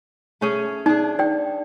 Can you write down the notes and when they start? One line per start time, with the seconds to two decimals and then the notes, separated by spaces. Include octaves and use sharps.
0.41 A3 C#4 G#4
0.86 D4 D#4 G#4
1.19 D5 G5